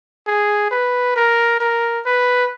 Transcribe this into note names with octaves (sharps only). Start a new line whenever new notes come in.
G#4
B4
A#4
A#4
B4